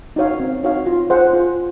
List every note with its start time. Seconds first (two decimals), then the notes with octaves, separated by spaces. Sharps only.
0.16 D#4 F#4 C#5 F5
0.40 C4
0.63 D#4 F#4 C#5 F5
0.86 F4
1.10 G#4 C5 F#5
1.33 F4